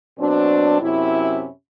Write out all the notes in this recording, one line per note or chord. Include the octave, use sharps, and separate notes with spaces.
B2 F#3 C4 D4
F#2 C3 C#4 E4